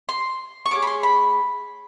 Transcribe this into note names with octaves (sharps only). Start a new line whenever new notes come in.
C6
C#6
A3 C#4 G#4 D6
B5
C6
B5